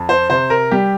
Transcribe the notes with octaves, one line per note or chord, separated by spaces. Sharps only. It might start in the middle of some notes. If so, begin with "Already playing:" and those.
Already playing: F2
C5
C3 C5
A#4
G3 G4